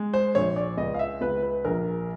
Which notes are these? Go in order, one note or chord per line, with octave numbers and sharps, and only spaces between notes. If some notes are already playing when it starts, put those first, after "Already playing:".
Already playing: G#3
C5
A#1 C#5
D5
C#2 D#5
F5
E5
C#2 B4
B4
A#1 A#4